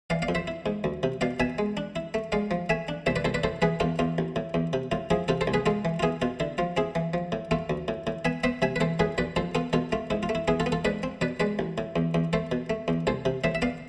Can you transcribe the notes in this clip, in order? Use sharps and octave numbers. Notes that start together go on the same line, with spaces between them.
E3 D5 F5
D5 F5
F2
C5 E5
E4
G#2
D2
C3
B2 D5 F5
B2 E5 G#5
G#3
D4
E4
A3
G#3 D5 F5
F3
A3 E5 G#5
D4
C2 C5 E5
B4 D5
C2 A4 C5
B4 D5
A2 A4 C5
E3 G#4 B4
E2 F4 A4
E2 F4
A1
A2
E2
C3
A2 F4
F3 E4 G#4
C3 F4 A4
A4 C5
C2
G#4 B4
G#3 F4 A4
E3
F4
B3 E4 G#4
B2 F4
D3 E4
F3 F4
C4 E4 G#4
E3
F3
A2
A3 F4 A4
D2
A2
A2
B3 E5 G#5
B3 C5 E5
C3 E5 G#5
B4
E3 A4 C5
A2 G#4 B4
B1 B4 D5
F2 A4 C5
B3 F4 A4
B2 F4 A4
A3 F4
G#2 E4
F4
A3
E4
B3 E4 G#4
F4 A4
B3
F4 A4
G#2 B4 D5
C4
B2 B4 D5
G#3 B4 D5
A1
A2
E2
E2
A3 A4 C5
B2
A3
E2
C2 A4 C5
C3
A2 C5 E5
E5
B3 D5 F5